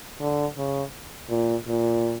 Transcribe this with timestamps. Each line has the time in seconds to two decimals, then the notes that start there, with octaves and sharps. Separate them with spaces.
0.20 D3
0.57 C#3
1.30 A#2
1.67 A#2